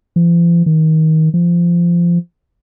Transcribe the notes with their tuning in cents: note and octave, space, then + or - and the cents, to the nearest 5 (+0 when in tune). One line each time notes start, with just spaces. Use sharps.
F3 -45
D#3 +25
F3 -20